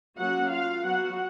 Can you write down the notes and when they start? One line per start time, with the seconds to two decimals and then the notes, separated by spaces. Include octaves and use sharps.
0.18 F#3 A#3 C#4 F#4 F#5
0.51 F4 F5
0.84 F#3 B3 F#4 F#5